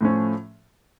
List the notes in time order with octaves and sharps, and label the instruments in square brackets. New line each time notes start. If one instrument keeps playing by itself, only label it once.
[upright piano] A2 F3 A3 C#4